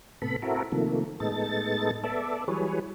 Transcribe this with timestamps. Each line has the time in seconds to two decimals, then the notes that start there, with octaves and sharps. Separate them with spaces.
0.22 A2 C3 B3 A4 B5
0.42 C4 E4 F#4 A4 A#4
0.72 C3 D#3 F3 A3 A#3
1.20 A2 G#3 B3 D#4 A4 A6
2.04 B3 A4 D5 E5
2.48 E3 F#3 G3 G#4 B4 C#5